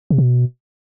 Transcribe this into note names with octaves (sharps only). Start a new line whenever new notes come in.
C3
B2